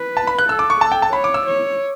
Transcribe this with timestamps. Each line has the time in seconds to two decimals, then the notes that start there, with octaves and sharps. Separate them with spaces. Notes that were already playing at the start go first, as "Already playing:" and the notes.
Already playing: B4
0.17 A5
0.27 B5
0.39 F#6
0.49 A4 E6
0.59 D6
0.70 C#6
0.81 A4 A5
0.92 G5
1.02 A5
1.13 C#5 B5
1.24 D6
1.34 E6
1.46 C#5